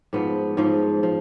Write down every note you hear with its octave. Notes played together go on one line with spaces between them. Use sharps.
G#2 F3 B3
G#2 F3
F3